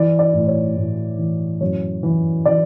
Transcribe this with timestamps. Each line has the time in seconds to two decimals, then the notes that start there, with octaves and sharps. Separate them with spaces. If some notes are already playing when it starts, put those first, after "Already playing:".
Already playing: E3 D5
0.19 D5
0.34 A2
0.47 C#5
0.76 A2
1.18 E3
1.61 F#2 C#5
2.03 E3
2.45 E3 D5